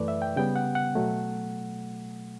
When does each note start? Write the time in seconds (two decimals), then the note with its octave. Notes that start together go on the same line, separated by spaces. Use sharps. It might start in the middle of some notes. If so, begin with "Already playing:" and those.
Already playing: F#2 E3 A3 B4 D5
0.08 E5
0.22 G5
0.36 C#3 G3 B3 G5
0.56 F#5
0.75 F#5
0.95 B2 F#3 A3